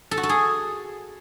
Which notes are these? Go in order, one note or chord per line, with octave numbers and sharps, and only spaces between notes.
A4
F#4
A4
G#4